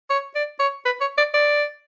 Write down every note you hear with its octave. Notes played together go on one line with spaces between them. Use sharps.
C#5
D5
C#5
B4
C#5
D5
D5